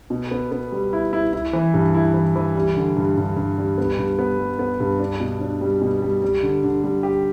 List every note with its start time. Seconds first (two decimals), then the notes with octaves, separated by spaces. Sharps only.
0.10 B2
0.31 B3
0.52 B3
0.72 G3
0.93 E4
1.13 E4
1.33 E4
1.53 E3
1.74 G2
1.94 E4
2.14 E3
2.36 E3
2.55 G3
2.76 D3
2.97 G2
3.17 G2
3.37 G2
3.58 G3
3.78 B3
3.98 G2
4.19 B3
4.39 G3
4.59 B3
4.80 G2
4.99 D4
5.20 B2
5.41 D4
5.61 G3
5.81 B2
6.02 G3
6.22 G3
6.43 D3
6.64 D3
6.83 G3
7.03 G4